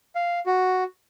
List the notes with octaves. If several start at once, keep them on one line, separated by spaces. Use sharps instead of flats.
F5
F#4